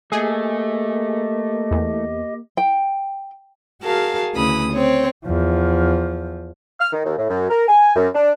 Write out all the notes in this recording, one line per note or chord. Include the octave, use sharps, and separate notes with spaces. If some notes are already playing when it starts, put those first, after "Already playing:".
A3 A#3 G4 G#4 D#5
E2
G5
F#4 G#4 A#4 F5 A5
D2 C#3 E3 B5 D#6
C4 C#5
E2 F3
F6
D#3
D#2
A2
F#2
A#4
G#5
F#2
D4